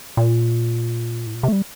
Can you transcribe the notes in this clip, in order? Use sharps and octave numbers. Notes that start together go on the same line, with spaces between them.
A#2
A2
A#2
C3
A3
G3